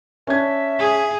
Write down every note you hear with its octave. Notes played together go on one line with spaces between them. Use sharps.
C#4 D4 E5 G#6
G#4